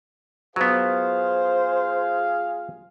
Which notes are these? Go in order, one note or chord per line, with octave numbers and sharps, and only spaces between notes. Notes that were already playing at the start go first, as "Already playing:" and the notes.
F#3 B3 F4 G#4 C5 F5